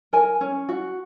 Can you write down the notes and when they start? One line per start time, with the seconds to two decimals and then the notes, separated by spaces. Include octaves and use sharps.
0.13 A#4 G#5
0.41 C#4
0.69 F#4